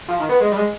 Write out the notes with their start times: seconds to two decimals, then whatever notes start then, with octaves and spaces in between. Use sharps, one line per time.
0.08 F3
0.20 D#3
0.29 B3
0.40 G#3
0.52 G3
0.56 G#3